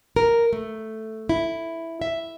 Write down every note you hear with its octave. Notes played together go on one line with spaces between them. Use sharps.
A#4
A3
E4
E5